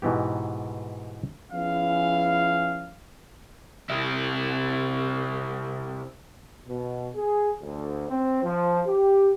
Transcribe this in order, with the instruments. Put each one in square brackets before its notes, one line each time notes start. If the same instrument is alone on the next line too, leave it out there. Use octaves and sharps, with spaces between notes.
[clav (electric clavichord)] G#2 B2 E3 B3 G4
[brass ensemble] F3 B3 C#4 E4 G#4 F5
[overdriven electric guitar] C3 E4
[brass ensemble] B2
G#4
D2
C4
F3
G4